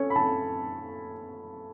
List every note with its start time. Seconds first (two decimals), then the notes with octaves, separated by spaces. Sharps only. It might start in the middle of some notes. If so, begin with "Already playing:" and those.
Already playing: C#4 A4 C#5
0.10 B5
0.16 A4 A5